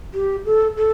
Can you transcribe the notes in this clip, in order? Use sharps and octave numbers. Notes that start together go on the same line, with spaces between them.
G4
A4
A4